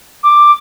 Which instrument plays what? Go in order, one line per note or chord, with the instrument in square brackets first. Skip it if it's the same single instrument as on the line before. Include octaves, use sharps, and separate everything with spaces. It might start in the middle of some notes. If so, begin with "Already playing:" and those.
[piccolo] D6